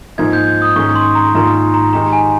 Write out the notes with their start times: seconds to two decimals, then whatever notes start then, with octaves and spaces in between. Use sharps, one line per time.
0.18 G#2 F3 A#3 D#4 G#6
0.33 G6
0.48 G6
0.62 D#6
0.76 G#2 D#3 A#3 C#4 G#4 C#6
0.96 C6
1.15 A#5
1.35 G#2 D#3 A#3 F4 A#5
1.74 A#5
1.93 D#3 G#3 D#4 G4 A#5
2.13 G#5